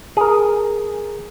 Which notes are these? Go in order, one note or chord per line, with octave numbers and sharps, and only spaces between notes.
G#4 A#4